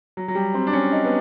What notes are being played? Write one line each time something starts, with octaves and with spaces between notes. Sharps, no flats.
F#3
F#3
G3
C4
D4
C#4
D#4
B3